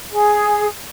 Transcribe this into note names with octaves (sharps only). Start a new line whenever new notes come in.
G#4